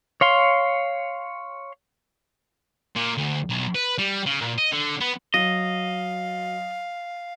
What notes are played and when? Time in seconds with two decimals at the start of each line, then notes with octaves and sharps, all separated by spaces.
0.21 C#5 F5 C6
2.96 A#2
3.17 D2
3.50 B1
3.75 B4
3.98 G3
4.26 C#3
4.41 A#2
4.58 D#5
4.72 D3
5.00 B3
5.34 F#3 D#5 F5